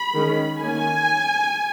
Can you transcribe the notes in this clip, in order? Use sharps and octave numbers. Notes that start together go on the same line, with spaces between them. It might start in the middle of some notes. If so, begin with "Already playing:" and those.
Already playing: B5
D#3 G#3 C#4
D#3 A#3 C#4 G#5